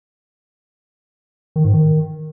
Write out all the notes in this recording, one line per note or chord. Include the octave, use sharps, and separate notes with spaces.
D#3
G#2
D#3